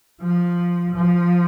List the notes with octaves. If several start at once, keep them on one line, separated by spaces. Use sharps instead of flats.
F3
F3